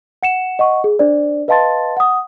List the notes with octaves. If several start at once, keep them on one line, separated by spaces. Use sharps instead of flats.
F#5 C#7 E7
D#5 F#5 C#6
G#4
D4 C5 D5
B4 D#5 F5 A5 C6 A6
F#5 D#6